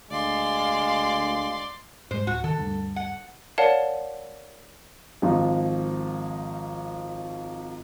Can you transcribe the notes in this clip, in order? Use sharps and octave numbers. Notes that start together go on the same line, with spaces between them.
D2 G#3 D5 F5 C6
G#2 G#3 C5
D1 F#4
D#3 A4
D2 G2
F#5
A#4 C#5 D5 F5 F#5 A5
G#1 F3 D#4 F4